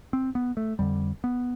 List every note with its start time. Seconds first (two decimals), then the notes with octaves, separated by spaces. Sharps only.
0.13 C4
0.35 B3
0.57 A3
0.79 F2 D3 G3
1.24 B3